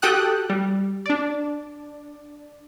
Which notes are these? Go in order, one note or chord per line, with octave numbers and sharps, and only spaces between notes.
F#4 G4 A4 G5 D#6 F#6
G3
D4 D5